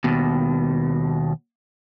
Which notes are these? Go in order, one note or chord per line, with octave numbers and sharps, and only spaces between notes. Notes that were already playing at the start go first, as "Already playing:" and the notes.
D#2 B2